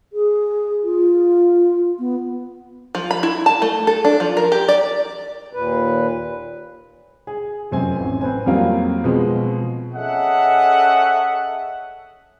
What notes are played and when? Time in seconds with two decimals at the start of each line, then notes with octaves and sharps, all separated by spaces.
0.13 G#4
0.83 F4
1.99 B3
2.95 F3
3.11 B5
3.23 E4
3.46 A5
3.62 A3
3.87 A4
4.05 D4
4.20 F3
4.37 A#4
4.52 G4
4.69 D5
5.53 D#2 A#2 B4
7.27 G#4
7.71 F1 F#2 C4 C5 G#5
8.00 A1
8.21 C4 B4 C5 G#5
8.46 F2 F#3 G3 A#3 C4 F4
9.04 B2 F3 G#3 C4
9.94 C#4 G#4 A4 D#5 E5 F#5